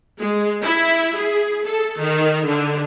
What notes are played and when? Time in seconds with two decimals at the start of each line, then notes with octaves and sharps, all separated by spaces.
0.20 G#3
0.63 E4
1.16 G#4
1.65 A4
2.00 D#3
2.46 D3